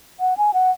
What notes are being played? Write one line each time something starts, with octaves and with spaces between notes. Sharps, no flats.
F#5
G#5
F#5